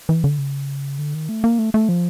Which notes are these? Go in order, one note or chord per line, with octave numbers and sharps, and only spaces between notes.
E3
D3
C#3
D3
D#3
A3
A#3
A3
A3
F3